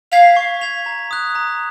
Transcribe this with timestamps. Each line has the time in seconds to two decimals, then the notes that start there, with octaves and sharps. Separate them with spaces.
0.12 F5 G#6 B6 F7
0.37 C#6
0.61 G#6 B6 F7
0.86 A#5
1.11 D#6 F#6
1.35 A#5